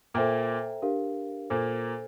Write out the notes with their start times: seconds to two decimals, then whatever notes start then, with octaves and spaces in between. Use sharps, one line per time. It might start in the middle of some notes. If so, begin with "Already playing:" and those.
0.14 A#2 A#3 A4 C5 E5 G5 A#5
0.82 D4 G4 A#4 F5
1.50 A#2 A#3 A4 C5